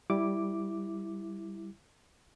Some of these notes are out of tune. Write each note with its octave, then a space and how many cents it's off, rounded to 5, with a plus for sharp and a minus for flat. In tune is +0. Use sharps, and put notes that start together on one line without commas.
G3 +0 E4 +0 D6 +0